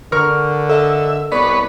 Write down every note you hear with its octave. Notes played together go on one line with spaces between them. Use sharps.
D3 A#4 C#6 F6
A4 D#5 E5
C2 B3 B4 C#5 D5